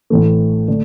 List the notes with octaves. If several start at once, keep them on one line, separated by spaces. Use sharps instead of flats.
A1 A2 E3 A3
D3 A3 D4